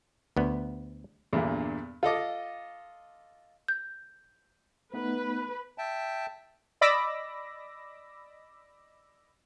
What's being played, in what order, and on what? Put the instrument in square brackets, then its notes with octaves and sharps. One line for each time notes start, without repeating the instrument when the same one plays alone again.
[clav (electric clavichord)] D2 B3
[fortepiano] E2 G2 A#2 D3
F4 A4 D#5 D6
[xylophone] G6
[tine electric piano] A3 B3 D#4 [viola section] B4
[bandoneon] E5 G5 A5
[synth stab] D5 D#5 B5 D6 E6 A#6